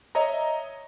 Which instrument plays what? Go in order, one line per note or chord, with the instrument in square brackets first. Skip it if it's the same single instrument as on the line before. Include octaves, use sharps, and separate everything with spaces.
[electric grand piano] C#5 D#5 E5 A#5